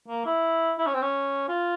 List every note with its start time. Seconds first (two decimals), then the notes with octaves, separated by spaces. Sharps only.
0.08 A#3
0.26 E4
0.78 E4
0.86 C#4
0.94 C4
1.02 C#4
1.49 F4